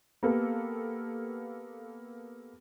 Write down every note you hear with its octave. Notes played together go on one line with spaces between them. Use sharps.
A#3 B3 G4 A4